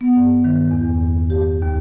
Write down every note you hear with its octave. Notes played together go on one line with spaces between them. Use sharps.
B3
G2
D#3
E2
G4
D#2